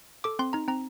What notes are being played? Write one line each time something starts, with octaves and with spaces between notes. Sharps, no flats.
A4 D6
C4 C6
D#4 A#5
C4 A#5